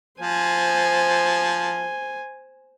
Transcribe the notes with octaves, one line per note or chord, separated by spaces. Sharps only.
F3 C5 G#5